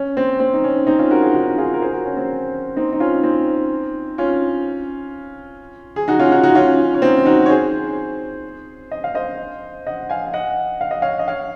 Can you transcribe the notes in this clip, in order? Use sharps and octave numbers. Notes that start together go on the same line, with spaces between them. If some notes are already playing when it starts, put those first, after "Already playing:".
Already playing: C#4
C4
C4
D#4
C#4
C4 D#4
C#4 F4
F#4 A#4
F4 G#4
D#4 F#4
F4 G#4
A#4
G#4 C5
F#4 A#4
C#4
C4
C4 D#4
D#4
C#4 F4
C4 D#4
C#4 F4
G#4
D#4 F#4
C#4 F4
D#4 F#4
D#4 F#4
C#4 F4
C#4
C4 D#4
D#4 F#4
C#5
G#4 C5
D#5
F5
C5 D#5
D#5 F#5
F5 G#5
G#5
D#5 F#5
F5
D#5
C#5 F5
D#5
C#5 F5